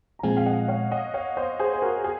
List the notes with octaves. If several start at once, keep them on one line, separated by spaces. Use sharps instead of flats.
A#5
A#2 F3 G#3 C4 F4 F5 G#5
F5
D#5 F#5
C#5 F5
D#5 F#5
C#5 F5
C5 D#5
G#4 C5
C5
F#4 A#4
G#4